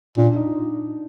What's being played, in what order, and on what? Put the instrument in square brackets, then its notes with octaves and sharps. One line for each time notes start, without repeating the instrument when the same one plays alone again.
[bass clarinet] A#2 [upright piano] D4
[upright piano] D#4